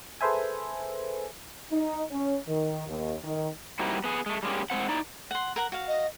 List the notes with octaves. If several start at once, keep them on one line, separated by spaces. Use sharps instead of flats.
G#4 A4 B4 C5 E5 G#5
D#4
C#4
D#3
D#2
D#3
G3 A#3 C4 D#4 E4 F#4
B3 G#4
G#3 A3
G3 G#3 A#3 C#4 G4
A2 G#3 A#3 C4 F#5
D#4 E4 D5
F#5 C6
A#4 F#5 A#5
F#4 F5
D#5